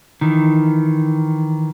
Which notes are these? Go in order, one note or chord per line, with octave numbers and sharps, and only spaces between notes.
D#3 E3